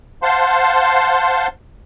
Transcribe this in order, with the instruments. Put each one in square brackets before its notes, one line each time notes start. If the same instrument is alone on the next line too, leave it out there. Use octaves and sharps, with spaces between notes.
[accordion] C5 F5 F#5 A5 C6